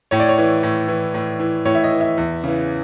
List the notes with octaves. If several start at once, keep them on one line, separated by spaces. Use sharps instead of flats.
A2 C#5
D5
C#5
E3
A2
E3
A2
E3
A2 C#5
E5
D#5
E3
E5
E2
C#3 E3